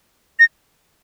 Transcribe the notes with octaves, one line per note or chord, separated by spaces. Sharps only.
A#6